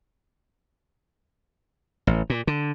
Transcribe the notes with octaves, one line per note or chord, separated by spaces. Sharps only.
A1
A#2
D3